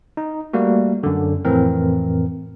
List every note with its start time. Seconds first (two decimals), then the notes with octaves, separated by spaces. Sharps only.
0.17 D#4
0.53 G3 A3 A#3 F#4
1.03 F#2 D3
1.45 F2 A2 E3 C4 A#4